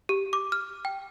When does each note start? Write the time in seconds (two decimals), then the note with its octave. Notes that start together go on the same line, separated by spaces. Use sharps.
0.09 G4
0.33 D6
0.52 F6
0.85 G5